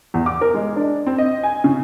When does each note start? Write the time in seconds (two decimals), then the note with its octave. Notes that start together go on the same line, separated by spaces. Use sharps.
0.14 E2
0.26 D6
0.41 A#4
0.54 G#3
0.76 D4
1.07 C4
1.18 D#5
1.43 G#5
1.64 C#3